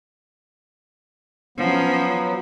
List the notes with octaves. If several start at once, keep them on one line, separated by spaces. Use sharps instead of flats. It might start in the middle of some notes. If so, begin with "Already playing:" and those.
F3 F#3 B3 C#4